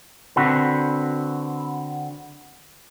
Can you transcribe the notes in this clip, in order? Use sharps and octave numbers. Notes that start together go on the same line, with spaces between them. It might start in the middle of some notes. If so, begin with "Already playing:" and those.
D3 C4 F#4 B4